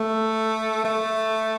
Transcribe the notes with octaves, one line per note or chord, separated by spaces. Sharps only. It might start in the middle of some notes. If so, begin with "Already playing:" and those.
Already playing: A3
A3